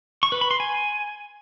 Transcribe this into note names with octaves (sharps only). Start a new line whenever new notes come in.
C#6
B4
B5
C6
G#5